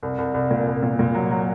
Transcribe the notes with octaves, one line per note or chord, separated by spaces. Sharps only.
C2
C2
C2
A#2
C2
A#2
A#2
F#3
F#3